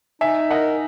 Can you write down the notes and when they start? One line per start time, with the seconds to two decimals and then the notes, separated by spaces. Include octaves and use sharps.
0.21 D#4 E5 G#5
0.51 A#4 D#5 F#5